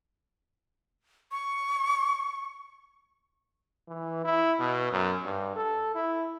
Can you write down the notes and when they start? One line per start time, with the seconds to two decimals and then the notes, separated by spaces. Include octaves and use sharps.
1.32 C#6
3.89 E3
4.25 E4
4.59 B2
4.92 F#2
5.25 G2
5.56 A4
5.95 E4